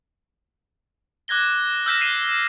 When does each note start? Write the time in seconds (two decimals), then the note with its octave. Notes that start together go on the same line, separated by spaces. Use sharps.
1.28 D6 F#6 G#6 A#6 G7
1.86 E6 F6 G6 A#6 B6 E7
2.01 F#6 C7 D#7 F7